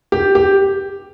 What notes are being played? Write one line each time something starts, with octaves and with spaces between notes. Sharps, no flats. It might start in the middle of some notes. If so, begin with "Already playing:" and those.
G4
G4